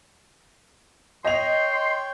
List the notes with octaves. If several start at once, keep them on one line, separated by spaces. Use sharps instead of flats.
C#5 D#5 G5 C6 F7